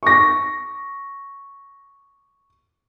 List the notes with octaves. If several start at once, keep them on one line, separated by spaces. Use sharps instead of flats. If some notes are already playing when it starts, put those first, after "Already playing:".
C#6 D6 A#6